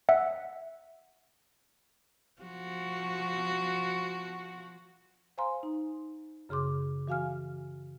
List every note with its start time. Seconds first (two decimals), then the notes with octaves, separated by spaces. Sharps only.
0.09 E5 F#5
2.41 F3 F#4
5.38 C5 F5 G#5 A#5 C6
5.63 D#4
6.49 F#2 C#3 G#4 C6 D6
7.07 E3 F#4 F5 G#5 F6